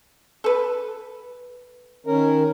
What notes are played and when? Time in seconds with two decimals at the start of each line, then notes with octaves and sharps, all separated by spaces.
0.44 A4 B4
2.07 D#3 C#4 A#4